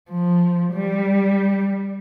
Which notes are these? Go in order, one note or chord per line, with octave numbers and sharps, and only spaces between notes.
F3
G3